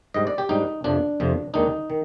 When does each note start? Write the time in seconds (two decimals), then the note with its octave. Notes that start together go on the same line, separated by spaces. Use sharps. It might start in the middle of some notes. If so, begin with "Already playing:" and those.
0.14 G#2 G3 D4 D#5
0.27 D5
0.38 G4
0.49 G#2 G3 D4 D#4
0.84 F2 C3 F3 D4
1.20 F2 C3 F3
1.54 D#2 D#3 G#3 D4 D#4
1.90 D#3